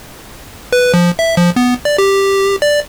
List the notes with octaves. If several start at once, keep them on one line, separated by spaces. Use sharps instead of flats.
B4
F3
E5
F3
B3
D5
G4
D5